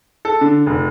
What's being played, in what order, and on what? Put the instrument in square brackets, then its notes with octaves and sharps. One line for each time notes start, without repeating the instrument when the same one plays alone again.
[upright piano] A4
D3
F1